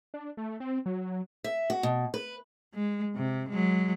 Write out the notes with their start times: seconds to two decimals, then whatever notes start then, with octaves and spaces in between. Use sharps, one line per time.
0.14 D4
0.37 A3
0.60 C4
0.86 F#3
1.44 E5
1.70 F#4
1.83 B2
2.14 B4
2.74 G#3
3.16 C3
3.50 F#3 G#3